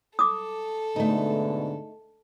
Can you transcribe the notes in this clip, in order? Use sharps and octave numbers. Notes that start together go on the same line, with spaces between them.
A4 D6 D#6
G#2 B2 D3 A3 D#4